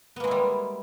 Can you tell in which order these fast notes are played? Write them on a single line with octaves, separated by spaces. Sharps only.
B3 A#3 G#3 E4 G3